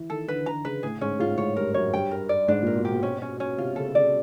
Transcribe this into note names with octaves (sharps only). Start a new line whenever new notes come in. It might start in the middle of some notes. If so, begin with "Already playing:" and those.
Already playing: E3
D#3 A4
D3 B4
D3 A#5
C#3 B4
A2 G#4
G#2 C#4
G#2 F4
A2
G#2 C#5
G2 A#4
F#2 C#5
G2 G5
A#4
D5
G#2 D4
A#2
A#4
B2
G4
B2
C#4
C#4
C#4
C3 F4
C#3 A4
C#3 D5